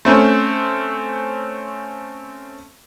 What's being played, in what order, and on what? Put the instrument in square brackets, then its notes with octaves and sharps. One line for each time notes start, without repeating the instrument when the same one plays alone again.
[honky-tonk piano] A3 C4 C#4